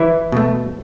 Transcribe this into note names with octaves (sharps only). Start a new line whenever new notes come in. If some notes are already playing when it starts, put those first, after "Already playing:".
Already playing: E3 E4
B2 A3